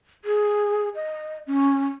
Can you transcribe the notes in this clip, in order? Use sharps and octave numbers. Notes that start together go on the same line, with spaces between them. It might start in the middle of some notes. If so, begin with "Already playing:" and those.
G#4
D#5
C#4